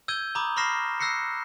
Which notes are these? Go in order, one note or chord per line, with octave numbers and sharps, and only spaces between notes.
E6 G6 G#6 D#7 G7
A#5 B5 D6 D#6
B5 C#6 F6 A#6 C7 E7
E6 F#6 A#6 C7 C#7